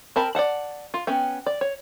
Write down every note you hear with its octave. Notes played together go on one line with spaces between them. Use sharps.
C4 A#4 A5 B5
D5 E5 F#5 A5
F4
B3 C#4 G5
D5
C#5